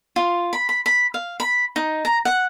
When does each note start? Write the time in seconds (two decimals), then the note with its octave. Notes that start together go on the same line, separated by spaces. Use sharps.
0.16 F4
0.53 B5
0.69 B5
0.86 B5
1.14 F5
1.40 B5
1.76 D#4
2.05 A#5
2.25 F#5